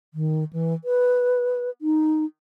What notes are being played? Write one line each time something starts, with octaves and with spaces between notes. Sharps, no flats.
D#3
E3
B4
D#4